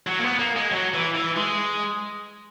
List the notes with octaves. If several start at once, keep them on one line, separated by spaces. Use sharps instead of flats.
F#3
A#3
B3
A#3
G#3
F#3
E3
E3
G#3